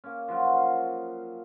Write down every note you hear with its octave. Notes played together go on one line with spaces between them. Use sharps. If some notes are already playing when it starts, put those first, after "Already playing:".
A#3 C#4
F3 F#3 F#4 A#4